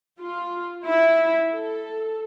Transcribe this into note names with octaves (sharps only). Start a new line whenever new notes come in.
F4
E4
A4